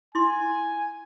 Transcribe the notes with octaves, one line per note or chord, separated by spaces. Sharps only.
E4 G#5 C6